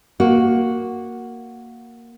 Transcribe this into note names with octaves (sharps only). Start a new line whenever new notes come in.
A#3 F#4